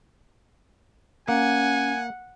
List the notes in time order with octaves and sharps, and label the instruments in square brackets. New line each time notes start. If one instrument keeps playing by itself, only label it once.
[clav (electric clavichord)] A#3 [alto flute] C#4 [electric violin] F#5 [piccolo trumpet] G#5